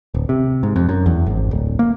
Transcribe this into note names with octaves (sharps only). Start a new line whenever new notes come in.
D1
C3
G#2
F2
F#2
E2
G#1
D1
A#3